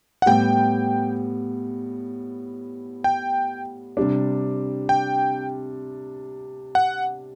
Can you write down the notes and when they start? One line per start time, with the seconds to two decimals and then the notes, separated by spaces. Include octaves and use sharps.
0.22 F#5
0.26 A2 G3 B3 G5
3.04 G5
3.97 C3 G3 D4
4.89 G5
6.75 F#5